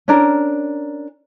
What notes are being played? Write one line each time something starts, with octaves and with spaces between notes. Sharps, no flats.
C#4 D4 A#4